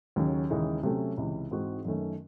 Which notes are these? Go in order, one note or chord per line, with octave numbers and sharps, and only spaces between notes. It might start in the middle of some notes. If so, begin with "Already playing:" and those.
D#2 C#3 F#3 C#4
D#2 C#3 E3 G#3 D#4
C3 F#3 A3 C#4
C#2 C3 E3
G#2 E3 C4 D#4 F#4
F#2 D#3 A3 C#4